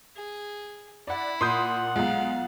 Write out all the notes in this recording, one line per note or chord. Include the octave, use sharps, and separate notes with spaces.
G#4
E4 D5 F#5 B5
A#2 F#5 C6 D#6 G6
B1 G#3 F4 F5